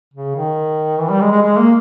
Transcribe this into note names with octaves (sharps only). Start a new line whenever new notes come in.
C#3
D#3
E3
G3
G#3
G#3
G#3
A#3